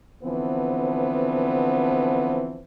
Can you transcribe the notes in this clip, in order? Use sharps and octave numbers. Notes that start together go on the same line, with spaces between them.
D3 E3 F3 B3 C4